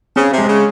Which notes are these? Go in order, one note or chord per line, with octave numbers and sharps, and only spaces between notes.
C#3 C4
C3
G#3
C#3